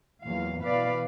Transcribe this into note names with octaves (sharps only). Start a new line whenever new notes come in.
E2 A#2 F#3 F5
B2 E3 B4 D5 F5